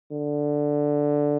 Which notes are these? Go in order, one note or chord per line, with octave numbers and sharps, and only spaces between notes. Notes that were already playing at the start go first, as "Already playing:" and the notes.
D3